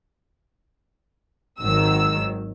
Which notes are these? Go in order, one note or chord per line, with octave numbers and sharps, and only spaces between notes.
G#1 D#3 F#3 E6